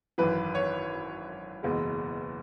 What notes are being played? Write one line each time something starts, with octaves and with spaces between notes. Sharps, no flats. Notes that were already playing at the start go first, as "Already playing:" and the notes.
G#1 F#2 E3 B4
C#5
F#1 E2 B2 G#3